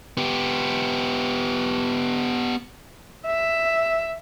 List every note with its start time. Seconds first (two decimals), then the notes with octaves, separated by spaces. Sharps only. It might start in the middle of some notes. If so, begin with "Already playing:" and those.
0.17 B3 G4
3.26 E5